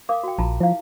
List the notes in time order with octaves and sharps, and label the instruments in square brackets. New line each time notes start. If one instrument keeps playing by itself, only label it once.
[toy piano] A#4 F5 D6
F#4 G5
[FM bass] A#1 [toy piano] F4 A5 A#5
[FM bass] F3 [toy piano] E4 F5